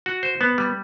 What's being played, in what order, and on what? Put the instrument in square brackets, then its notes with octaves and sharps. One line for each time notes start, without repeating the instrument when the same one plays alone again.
[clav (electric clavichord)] F#4
C5
B3
G3